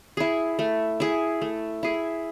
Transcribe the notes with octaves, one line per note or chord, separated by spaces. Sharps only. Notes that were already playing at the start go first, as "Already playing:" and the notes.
E4 G#4
A3
E4 G#4
A3
E4 G#4